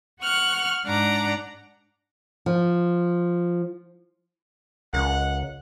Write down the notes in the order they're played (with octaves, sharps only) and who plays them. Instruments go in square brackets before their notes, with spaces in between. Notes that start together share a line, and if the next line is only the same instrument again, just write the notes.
[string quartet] F#5 C#6 F6 F#6
G#2 D4 F#5 A#5 D6
[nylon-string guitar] F3
[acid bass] C#2 [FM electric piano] C#3 A#4 [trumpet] F#5